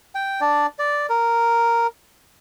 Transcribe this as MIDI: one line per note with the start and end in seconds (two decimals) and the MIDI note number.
0.15 0.41 79
0.41 0.67 62
0.41 0.67 74
0.79 1.06 74
1.10 1.87 70